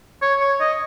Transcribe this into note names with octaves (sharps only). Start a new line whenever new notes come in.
C#5
C#5
D#5